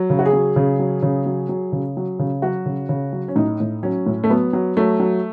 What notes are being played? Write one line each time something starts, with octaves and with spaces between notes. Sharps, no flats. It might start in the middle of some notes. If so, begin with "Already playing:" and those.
Already playing: F#3
C#3
F#4
G#4
F#3
C#3
F#3
C#3
F#3
F#3
C#3
F#3
C#3
F#3 F#4
C#3
C#3
F#3
C#4
A2 D#4
A2
F#3 C#4
A2
A3
F#3 B3
F#3
F#3 A3
F#3